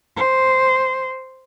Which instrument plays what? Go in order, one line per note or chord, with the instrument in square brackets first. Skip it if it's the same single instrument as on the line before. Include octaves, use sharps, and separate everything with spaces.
[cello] C5